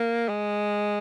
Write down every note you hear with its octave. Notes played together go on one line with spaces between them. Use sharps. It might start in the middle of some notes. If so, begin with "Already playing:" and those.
Already playing: A#3
G#3